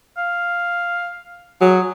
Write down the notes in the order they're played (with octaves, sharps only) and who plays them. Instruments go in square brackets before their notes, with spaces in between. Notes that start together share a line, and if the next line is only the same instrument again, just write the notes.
[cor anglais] F5
[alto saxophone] F#3 [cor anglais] G#4